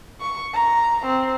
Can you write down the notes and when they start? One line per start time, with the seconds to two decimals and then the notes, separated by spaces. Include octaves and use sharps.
0.21 C#6
0.53 A#5
1.06 C4